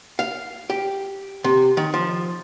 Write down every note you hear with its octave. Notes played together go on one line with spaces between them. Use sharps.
F5
G4
C3
D#3
F3